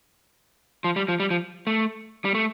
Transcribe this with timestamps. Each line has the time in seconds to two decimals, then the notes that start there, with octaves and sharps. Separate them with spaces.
0.84 F3
0.96 G3
1.08 F3
1.20 G3
1.31 F3
1.67 A3
2.25 G3
2.35 A3